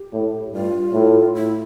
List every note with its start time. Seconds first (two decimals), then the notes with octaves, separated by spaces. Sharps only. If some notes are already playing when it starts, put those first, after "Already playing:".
Already playing: G4
0.13 A2
0.53 G2 F4
0.94 A2
1.35 E4